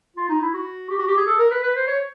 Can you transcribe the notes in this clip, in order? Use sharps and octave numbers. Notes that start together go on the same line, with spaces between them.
F4
D#4
E4
F#4
G4
F#4
G4
G#4
A4
A#4
B4
B4
C5
C#5